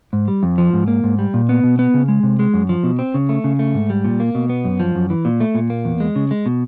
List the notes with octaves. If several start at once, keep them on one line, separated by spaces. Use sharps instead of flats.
G#2
G3
F2
F3
G#2
A#3
G#2
G3
A#2
B3
B2
B3
C#3
G#3
C3
G#3
F#2
F3
B2
C4
C#3
A3
C#3
A3
G#2
G3
A#2
A#3
B2
B3
F#2
F3
F#2
E3
A#2
A3
A#2
A#3
E2
G#3
C#3
G#3
B2